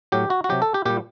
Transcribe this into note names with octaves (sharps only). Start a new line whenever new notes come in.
A2 F#3 G4
F#4
F#4
C3 F#3 G4
A4
G4
A#2 G3 G4